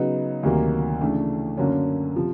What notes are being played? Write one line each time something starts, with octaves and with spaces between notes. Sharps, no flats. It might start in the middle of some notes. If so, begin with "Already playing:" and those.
Already playing: C#3 F#3 B3 D#4
D2 C3 D#3 F#3 A#3
C#3 E3 A3 D4
F#2 D3 F#3 A#3 C#4
C3 F3